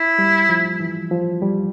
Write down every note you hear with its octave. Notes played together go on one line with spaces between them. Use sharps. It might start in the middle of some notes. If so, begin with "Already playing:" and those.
Already playing: E4
G3
F3
E3
F3
G3